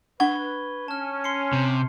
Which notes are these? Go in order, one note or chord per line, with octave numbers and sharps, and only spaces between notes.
D4 B4 F#5 C#6 G#6 G7
C#4 A5 F6
C6 C7 C#7
C3